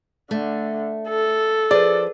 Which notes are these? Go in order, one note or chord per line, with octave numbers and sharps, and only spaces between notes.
D3 A3
A4
F3 G#4 B4 D5